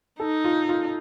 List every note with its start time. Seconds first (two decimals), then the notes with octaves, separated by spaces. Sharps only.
0.20 D#4 A4
0.44 F4
0.69 F4